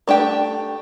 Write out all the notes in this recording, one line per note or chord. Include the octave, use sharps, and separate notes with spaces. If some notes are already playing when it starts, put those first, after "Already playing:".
A3 D4 G4 G5